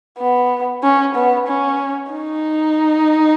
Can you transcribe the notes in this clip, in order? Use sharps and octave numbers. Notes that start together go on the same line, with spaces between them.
B3
C#4
B3
C#4
D#4